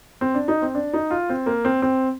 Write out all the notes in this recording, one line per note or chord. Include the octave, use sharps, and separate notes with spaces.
C4
D4
D#4
C4
D4
D#4
F4
C4
A#3
C4
C4